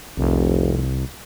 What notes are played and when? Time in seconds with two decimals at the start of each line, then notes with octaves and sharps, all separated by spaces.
0.18 F1 C2